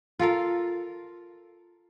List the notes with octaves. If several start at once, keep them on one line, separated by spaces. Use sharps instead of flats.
F4 A4 A#4 F5